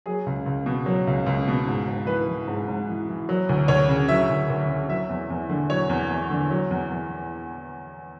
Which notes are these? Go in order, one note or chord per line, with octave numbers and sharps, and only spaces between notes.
F#3 G#4
C#2
C#2
B2
F#3
C#2
C#2
B2
G#2
G#2
E3 B4
E3
G#2
G#2
E3
E3
F#3
D2
D2 C#5
C#3
F#3 E5
D2
D2
C#3
F#3 E5
E2
E2
D3
F#3 C#5
E2
E2
D3
F#3
E2
E2